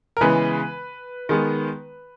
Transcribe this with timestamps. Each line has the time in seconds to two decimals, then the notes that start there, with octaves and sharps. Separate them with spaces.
0.17 A#4
0.21 C#3 E3 G#3 B3 B4
1.29 D#3 G#3 B3